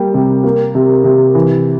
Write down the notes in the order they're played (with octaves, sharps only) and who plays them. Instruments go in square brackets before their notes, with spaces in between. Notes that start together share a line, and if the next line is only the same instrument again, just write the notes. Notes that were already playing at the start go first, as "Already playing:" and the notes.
Already playing: [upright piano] G3 A#3 G5
C3
A#3
C3
C3
E3